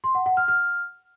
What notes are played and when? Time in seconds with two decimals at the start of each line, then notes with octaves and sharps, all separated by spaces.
0.04 C6
0.15 F#5
0.26 F#5
0.37 F6
0.48 F6